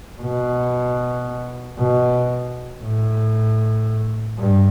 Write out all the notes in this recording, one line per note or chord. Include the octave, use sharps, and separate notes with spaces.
B2
B2
A2
G2